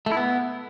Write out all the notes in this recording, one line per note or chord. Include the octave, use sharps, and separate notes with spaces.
A3
E4
B3